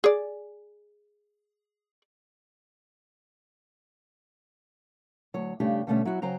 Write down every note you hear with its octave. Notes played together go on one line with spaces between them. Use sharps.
G#4 D5
D2 F#3 C#5
G2 C#3 A3 D4 G4
B2 D3 G3 A3 C#4 E5
F#3 E4 F#4
C#3 F#3 C5 G5 A#5